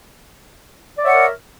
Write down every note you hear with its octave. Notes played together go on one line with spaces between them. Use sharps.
A#4 C#5 D5 E5 F#5